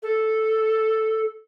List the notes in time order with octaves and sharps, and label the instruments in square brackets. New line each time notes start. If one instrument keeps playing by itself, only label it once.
[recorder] A4